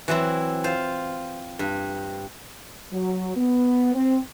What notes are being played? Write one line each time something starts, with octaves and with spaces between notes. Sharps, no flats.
E3 F#3 C4 E4
F4 C5
G2
F#3
B3
C4